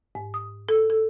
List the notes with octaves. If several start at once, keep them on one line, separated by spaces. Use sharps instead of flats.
G#2
D#6
A4
A4